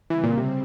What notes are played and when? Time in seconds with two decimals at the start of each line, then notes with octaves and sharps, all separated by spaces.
0.10 C#3 E3 G3 C4
0.23 A#2
0.37 C3